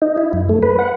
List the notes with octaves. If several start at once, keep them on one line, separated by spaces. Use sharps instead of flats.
D#4
E4
F#2
A3
B4
F#5